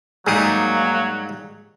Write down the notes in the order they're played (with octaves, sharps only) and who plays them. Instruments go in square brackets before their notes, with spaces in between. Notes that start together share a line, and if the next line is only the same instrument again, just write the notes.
[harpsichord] G#2 D#4 [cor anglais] F#3 [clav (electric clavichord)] G3 G4 G#4 [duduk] A#3